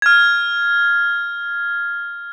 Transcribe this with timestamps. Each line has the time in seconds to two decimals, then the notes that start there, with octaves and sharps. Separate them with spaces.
0.02 F6 G#6